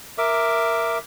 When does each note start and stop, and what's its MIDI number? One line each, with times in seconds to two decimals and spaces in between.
0.18 0.98 70
0.18 0.98 76
0.18 0.98 86